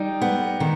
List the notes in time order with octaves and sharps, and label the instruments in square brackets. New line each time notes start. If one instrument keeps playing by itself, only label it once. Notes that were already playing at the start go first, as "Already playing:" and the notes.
Already playing: [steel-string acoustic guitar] G3 [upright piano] D#4
[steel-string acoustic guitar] B3
D#3